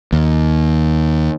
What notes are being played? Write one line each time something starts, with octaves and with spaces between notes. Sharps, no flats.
D#2